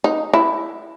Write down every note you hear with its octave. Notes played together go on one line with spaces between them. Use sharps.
D#4
E4